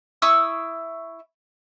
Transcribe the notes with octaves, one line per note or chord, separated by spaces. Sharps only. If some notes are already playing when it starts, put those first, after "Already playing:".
E4 C#6 D#6 E6